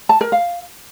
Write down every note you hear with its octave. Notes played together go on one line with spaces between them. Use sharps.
A5
A#4
F5